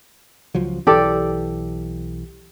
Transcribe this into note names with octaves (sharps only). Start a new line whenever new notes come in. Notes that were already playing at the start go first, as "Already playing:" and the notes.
C#2 F3 F#3
B1 E3 G4 A4 D5